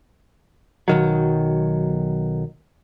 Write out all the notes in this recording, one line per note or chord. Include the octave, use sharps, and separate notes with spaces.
B1 D#3 F#3